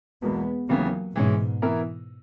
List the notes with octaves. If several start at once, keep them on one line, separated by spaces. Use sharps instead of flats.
E2 B2 G#3 A#3 B3
D#2 C#3 E3 F#3 A#3 B3
G#2 B2 E3 G#3 C#4
E3 B3 E4 A#4